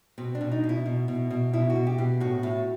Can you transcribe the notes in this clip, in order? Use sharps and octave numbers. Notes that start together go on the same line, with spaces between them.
B2 C4
D4
B2
D#4
B2
E4
B2
B2
B2
B2 E4
F#4
B2
G4
B2
A2 F#4
A2